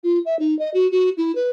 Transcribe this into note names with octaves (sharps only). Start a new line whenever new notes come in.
F4
E5
D#4
D#5
F#4
F#4
E4
B4